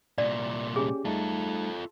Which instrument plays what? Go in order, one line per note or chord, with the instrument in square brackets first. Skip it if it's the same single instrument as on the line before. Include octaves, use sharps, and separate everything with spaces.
[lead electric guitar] C2 A#2 [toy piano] D5
[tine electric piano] C#4 G4 [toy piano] G#4
[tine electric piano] G3 A3 D#4 [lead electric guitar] F4 A4